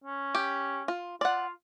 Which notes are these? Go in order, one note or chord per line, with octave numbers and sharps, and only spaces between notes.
C#4
G4
F4
F4 D5 F#5